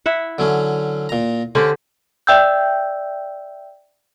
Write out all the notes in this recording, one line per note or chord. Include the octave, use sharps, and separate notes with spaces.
E4 E5 F#5
D3 F#3 C#4
A#2 A#5
D3 C4 C#4 G4
D5 E5 G5 E6 G6